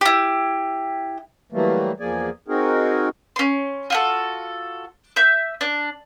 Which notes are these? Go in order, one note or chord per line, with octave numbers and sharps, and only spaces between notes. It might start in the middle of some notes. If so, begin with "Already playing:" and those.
E4 G4
E3 F#3 G3 A3 A#3
E2 F3 A#3 G#4 D5 G#5
C4 D#4 F#4 G#4 A#4
C#4 C6
F4 F#4 A4
E5 G6
D4